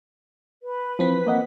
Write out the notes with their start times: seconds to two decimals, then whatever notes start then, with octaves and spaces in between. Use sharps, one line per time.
0.62 B4
0.99 E3 F3 C4 B6
1.27 A#3 D#5 F#5